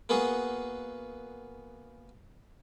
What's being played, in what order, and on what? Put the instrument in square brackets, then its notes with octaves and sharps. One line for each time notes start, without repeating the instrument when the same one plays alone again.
[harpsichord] A#3 B3 F#4 G#4